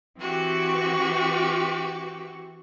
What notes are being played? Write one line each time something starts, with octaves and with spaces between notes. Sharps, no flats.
E3 C4 F#4 G4 C#6